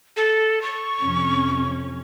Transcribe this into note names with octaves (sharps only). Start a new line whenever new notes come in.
A4
C#6
F2 C3 C#4